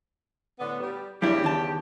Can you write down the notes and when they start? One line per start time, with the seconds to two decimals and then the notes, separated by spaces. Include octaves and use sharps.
0.59 A2 D3 B3
0.80 G3
1.22 E2 C#3 G3 D4 E4 G4
1.44 D#3 A5